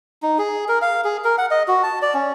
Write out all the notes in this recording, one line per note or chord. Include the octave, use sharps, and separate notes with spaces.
D#4
G#4
A#4
F5
G#4
A#4
F#5
D#5
F#4
A5
D5
C#4